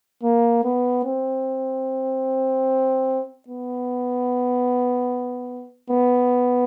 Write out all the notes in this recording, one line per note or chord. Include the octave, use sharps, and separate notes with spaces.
A#3
B3
C4
B3
B3